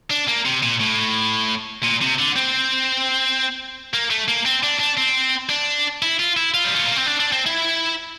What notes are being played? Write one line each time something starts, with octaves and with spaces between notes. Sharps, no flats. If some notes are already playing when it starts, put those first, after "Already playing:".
D4
A#3
C3
A#2
A2
A#2
C3
D3
C4
A#3
A3
A#3
C4
D4
D4
C4
D4
E4
F4
E4
F4
G3
A3
A#3
C4
D4
D4
C4
E4